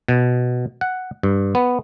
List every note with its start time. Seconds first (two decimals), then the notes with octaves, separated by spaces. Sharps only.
0.08 B2
0.81 F#5
1.23 G2
1.55 B3